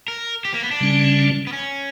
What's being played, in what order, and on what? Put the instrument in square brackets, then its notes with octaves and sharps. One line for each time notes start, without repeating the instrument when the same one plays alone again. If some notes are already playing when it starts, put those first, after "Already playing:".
[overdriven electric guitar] A#4
G4
A#3
B3
D4
[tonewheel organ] C#3 G3 C#4
[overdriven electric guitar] B3
C#4